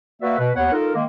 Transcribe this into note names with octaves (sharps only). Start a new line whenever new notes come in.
A#3 F#4 B4 D5 E5
B2 B4
D#2 B3 C#5 F#5
D#4 F4 A4 A#4
D#3 G#3 A#3